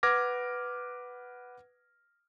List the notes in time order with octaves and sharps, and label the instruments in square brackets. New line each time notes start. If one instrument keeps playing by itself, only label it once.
[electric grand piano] B4 F#5 D6 F6 G#6 A#6